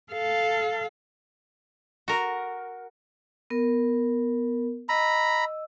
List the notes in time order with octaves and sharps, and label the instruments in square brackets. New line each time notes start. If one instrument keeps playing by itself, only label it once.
[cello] A4 F5
[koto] F#4 A#4
[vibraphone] B3 A#4
[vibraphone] D#5 E6 [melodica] A#5 B5